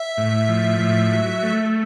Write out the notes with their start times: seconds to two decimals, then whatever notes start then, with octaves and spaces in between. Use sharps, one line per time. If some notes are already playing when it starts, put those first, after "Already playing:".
Already playing: E5
0.17 A2
0.49 F3
0.80 A2
1.12 F#3
1.43 A3